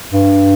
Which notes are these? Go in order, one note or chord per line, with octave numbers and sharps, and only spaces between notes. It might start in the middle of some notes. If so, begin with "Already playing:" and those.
G2